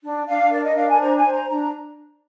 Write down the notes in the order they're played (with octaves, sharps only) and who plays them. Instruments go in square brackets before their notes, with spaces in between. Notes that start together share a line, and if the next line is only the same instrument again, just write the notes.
[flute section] D4
D4 F5
A#4 D5
D#5
D4 F5
G#5
C5 A#5
G#5
C5
A#5
D4 A#5